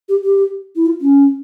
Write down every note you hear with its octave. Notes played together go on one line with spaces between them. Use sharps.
G4
G4
E4
F4
C#4